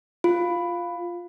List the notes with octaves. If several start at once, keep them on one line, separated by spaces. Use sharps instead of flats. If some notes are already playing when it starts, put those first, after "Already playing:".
F4